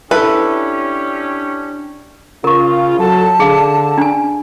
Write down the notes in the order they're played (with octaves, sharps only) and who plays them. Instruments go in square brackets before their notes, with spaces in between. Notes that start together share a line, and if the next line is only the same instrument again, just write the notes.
[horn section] C#4 G4 [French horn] D4 [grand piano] E4 A4 [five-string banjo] B4
[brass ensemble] C#3 F4 [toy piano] A#4 C#6
[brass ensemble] F#3 A4 [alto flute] A5
[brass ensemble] D3 [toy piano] G#4 F5
[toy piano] D4 G#5